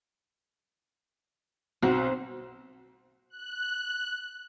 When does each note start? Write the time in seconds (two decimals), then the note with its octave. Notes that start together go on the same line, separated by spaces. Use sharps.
1.82 B1 C4 F#4
3.30 F#6